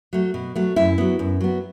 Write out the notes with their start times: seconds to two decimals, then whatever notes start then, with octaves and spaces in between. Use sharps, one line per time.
0.13 F#3 A3
0.34 B2
0.56 F#3 A3
0.76 F#2 E4
0.98 F#3 B3
1.19 F#2
1.41 F#3 B3